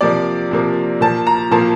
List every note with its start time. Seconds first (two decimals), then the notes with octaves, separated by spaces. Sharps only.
0.01 C3 F3 A#3 D5
0.51 C3 F3 A#3
1.01 A#2 F3 A#3 A5
1.27 A#5
1.51 A#2 F3 A#3 A5